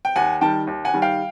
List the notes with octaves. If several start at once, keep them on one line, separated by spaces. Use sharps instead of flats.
G5
D#2 F#5 G#5
D#3 G3 G5 A5
D#2
F#5 G#5
D#3 G3
F5 G5